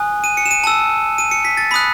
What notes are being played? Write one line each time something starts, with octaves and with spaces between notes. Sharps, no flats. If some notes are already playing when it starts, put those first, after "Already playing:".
Already playing: G#5 D#6 F#6
D#7
C#7
E7
D#7
A5 E6
D#7
C#7
B6
A6
B5 D#6 F#6 B6